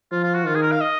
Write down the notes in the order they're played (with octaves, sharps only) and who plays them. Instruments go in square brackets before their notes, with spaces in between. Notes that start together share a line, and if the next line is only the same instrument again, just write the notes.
[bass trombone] F3 [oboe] F4
[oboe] F4
F#4
[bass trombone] D#3 [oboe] F4
[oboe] G#4
A#4
F5
D#5